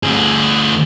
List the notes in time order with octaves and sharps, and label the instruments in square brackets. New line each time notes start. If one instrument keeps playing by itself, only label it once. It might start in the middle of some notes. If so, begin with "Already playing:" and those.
[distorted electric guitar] D2 G#4